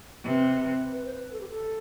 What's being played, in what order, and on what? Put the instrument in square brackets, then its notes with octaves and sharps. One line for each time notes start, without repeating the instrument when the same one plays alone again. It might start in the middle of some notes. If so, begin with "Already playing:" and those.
[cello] C3 [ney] B4
[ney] B4
C5
B4
A4
G4
A4